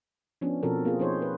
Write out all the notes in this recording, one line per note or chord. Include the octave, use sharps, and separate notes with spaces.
F3 B3 C#4 D4
B2 F3 C4 F#4 A4 A#4
A#3 C4 F4 G#4
F3 D#4 G#4 C5 C#5
B4